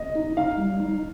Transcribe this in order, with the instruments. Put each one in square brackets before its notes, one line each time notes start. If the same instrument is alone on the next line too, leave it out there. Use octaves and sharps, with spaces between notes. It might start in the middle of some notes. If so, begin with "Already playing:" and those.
Already playing: [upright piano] D#5
[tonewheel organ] D#4
[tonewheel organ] D#4 [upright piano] F5
[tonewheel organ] G3
D#4